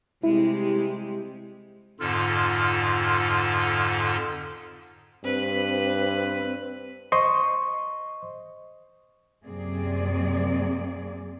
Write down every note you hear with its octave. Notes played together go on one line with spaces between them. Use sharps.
C3 G3 G#3 E4
F2 G#2 D3 F4 A4 F6
G2 C4 B4
C5 D#5 C6 C#6
F#2 C3 A#3 C4 G#4 D5